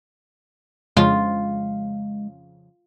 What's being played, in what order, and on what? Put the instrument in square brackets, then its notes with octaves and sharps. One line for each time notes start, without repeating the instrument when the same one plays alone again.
[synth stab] F2 C#3 F3 [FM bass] G#3 [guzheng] F4